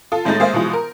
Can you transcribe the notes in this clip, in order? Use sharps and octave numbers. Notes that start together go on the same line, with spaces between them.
F4 A4
A2 G#3 A3 D#4 G6 A6
G#3 A#3 G#4 C5 E5 F5
B2 E3 F3 G#3
A#4